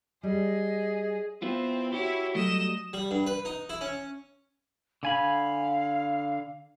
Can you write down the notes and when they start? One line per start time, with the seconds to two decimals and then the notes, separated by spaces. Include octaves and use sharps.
0.23 G3 G#4 D#5
1.42 B3 C4 E4 F4
1.93 E4 F#4 G4 C#5
2.35 F#3 G3 A3 D#5 E7
2.93 G3
3.11 G2
3.27 B4
3.45 D#4
3.69 E4
3.81 C#4
5.03 D3 F5 G#5 B5